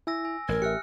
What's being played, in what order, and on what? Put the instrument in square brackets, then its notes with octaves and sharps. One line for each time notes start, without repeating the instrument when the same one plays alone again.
[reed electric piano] E4 [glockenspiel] G#5 E6 A#6
[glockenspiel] G#5
[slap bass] A1 [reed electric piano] G2 G#6 [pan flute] A#4
[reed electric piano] G4 E5 [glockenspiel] F6 F#6 C#7